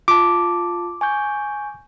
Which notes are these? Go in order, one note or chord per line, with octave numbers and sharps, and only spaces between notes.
F4 A5 D6
G#5 C#6 G6